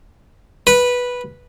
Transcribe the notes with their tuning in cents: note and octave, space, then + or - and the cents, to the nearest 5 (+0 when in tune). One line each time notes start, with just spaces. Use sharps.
B4 -10